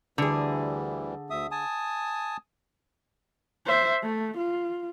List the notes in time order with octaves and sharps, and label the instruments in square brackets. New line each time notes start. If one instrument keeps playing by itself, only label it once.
[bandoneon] D2 E3 G3 [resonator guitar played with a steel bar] D3 G#4
[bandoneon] D2 E5 D#6
G#5 A5 D#6
[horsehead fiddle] C5 E5
A3
F4